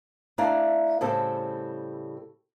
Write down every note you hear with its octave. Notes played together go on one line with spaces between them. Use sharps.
A3 D4 E4 D5 F5 A#5
A2 C#3 G3 C4 A4